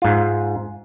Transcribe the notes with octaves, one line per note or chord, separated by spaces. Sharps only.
G#2 F4